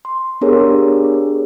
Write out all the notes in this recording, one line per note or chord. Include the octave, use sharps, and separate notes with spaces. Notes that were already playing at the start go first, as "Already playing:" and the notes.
C6
B3 D4 G4 G#4 A#4 C#5